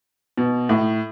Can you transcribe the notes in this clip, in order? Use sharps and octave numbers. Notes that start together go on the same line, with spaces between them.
B2
A2